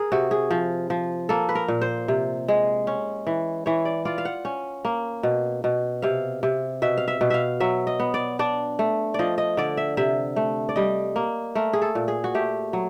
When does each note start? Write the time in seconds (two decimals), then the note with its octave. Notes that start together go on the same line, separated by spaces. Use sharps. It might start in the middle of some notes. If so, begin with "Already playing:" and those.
Already playing: G#4 A#4
0.12 C3 F#4
0.31 G#4
0.51 F3
0.90 F3
1.29 A#3 A4
1.49 B4
1.55 A#4
1.68 A#2
1.81 C5
2.08 C3
2.48 G#3
2.87 C#4
3.27 E3
3.66 E3 C#5
3.85 D5
4.05 F4 D5
4.18 F5
4.25 F#5
4.45 C#4
4.85 A#3
5.23 B2
5.64 B2
6.02 C3 F5
6.43 C3
6.82 B2 E5
6.97 F5
7.08 E5
7.21 B2
7.30 E5 F5
7.60 F#3 E5
7.87 D#5
8.00 B3
8.14 D5
8.39 D4 D5
8.79 A3
9.14 F3 D5 D#5
9.38 D#5
9.57 D3 D5
9.77 E5
9.97 C3 E5
10.36 A3
10.69 D5
10.76 G3 D#5
11.16 A#3
11.55 A3 A#4
11.73 G#4
11.82 A4
11.95 A#2
12.08 G#4
12.24 F#4
12.35 A3 G4
12.73 F#3